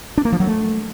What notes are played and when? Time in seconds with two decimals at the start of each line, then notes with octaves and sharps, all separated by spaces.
0.17 D4
0.25 A#3
0.32 F3
0.40 F#3
0.47 A3